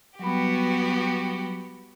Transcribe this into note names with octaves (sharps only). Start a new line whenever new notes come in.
F#3 G3 B3 F#4 G4 B5